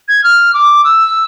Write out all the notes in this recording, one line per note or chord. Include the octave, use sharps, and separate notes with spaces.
G#6
F6
D6
E6